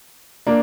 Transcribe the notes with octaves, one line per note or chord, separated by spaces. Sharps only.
A#3 D4